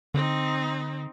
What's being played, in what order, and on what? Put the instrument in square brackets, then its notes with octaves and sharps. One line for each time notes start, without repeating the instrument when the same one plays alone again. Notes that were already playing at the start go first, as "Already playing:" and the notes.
[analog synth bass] D3 [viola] C4 D#4